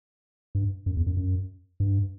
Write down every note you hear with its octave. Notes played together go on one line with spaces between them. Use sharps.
G2
F#2
E2
F#2
F#2
G2